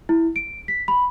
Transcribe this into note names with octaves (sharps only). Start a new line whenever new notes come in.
E4
D7
B6
B5